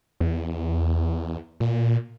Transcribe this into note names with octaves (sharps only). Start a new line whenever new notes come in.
E2
A#2